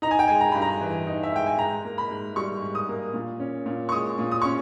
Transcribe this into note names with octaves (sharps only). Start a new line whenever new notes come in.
D#4 A#5
G#5
G5
G#3 G#5
A#5
G2 B5
A#5
E3
D#4
E5
G#3 G5
G#5
G#2 A#5
A#3
B5
G#2
G3 C#6
G#2
D#6
A#3
A#2
C#4
A#2
C#6
G#3 D#6
A#2
D#6
C#4 C#6